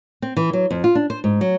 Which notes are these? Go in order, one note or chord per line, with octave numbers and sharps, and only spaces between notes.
C4
E3
F#3
F2
F4
D4
C5
G#2
F#3